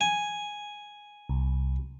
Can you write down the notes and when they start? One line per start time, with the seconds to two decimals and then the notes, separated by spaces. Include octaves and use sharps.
0.01 G#5
1.29 C2